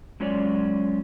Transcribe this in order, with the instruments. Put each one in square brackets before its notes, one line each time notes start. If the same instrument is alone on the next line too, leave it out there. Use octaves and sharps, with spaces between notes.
[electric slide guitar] F#3 G#3 C#4 F4 C#5 D5